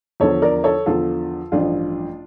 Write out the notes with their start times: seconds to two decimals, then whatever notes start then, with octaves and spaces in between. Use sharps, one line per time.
0.20 E2 D3 F3 A4 C#5
0.42 A#4 D5
0.64 A4 C#5
0.86 E2 D3 F3 F4 A4
1.52 A1 G2 F3 D4 F4